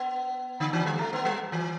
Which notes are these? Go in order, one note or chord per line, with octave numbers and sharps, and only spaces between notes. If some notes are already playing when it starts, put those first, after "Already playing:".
Already playing: B3
D3
E3
G3
A3
B3
G3
E3